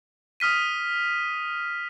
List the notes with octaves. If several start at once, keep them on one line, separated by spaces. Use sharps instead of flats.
D#6 F6 B6 D#7